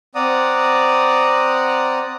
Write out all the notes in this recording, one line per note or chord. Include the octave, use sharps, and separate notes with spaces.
C4 D5 F#5 A#5 D#6